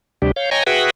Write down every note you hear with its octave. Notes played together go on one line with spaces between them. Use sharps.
D2 C3 G3 D4 G4
C#5 F5 G6
C#5 D#5 G5 G#5 A#5 C#6
F#4 G#4 B4 E5 F#5 G5